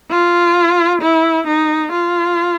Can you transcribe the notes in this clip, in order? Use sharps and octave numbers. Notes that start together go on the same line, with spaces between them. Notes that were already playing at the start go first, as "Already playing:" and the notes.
F4
E4
D#4
F4